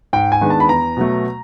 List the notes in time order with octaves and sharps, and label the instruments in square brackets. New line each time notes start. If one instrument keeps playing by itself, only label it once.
[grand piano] G#2 G5
G#5
D#3 G#3 B3 D4
A5
B5
E2 A#5
B2 F#3 A3